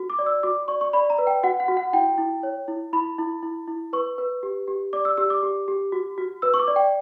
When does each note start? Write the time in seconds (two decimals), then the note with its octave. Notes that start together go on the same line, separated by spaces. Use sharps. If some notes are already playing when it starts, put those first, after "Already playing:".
Already playing: F#4
0.10 D6
0.19 D5
0.26 E6
0.43 F#4 D6
0.68 D5 C#6
0.81 C#6
0.93 D5 B5
1.10 A#5
1.18 B4
1.27 G5
1.43 F#4 F#5
1.60 F#5
1.68 F#4
1.77 F#5
1.93 E4 G5
2.18 E4
2.43 C#5
2.68 E4
2.93 E4 B5
3.18 E4
3.43 E4
3.68 E4
3.93 B4 C#6
4.18 B4
4.43 G4
4.68 G4
4.93 D5 D6
5.05 E6
5.17 G4 E6
5.30 D6
5.43 G4
5.68 G4
5.92 F#4
6.18 F#4
6.42 B4 E6
6.54 C#6
6.59 D6
6.68 D5
6.76 G5